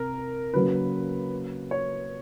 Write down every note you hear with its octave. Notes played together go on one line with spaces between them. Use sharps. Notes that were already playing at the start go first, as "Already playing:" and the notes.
Already playing: C3 A#4
C#3 F#3 A#3 B4
C#5